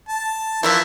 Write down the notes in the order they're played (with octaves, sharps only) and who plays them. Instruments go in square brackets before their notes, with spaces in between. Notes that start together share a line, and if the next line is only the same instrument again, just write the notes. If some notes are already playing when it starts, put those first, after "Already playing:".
[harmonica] A5
[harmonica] E3 F3 [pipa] E4 A#4 E5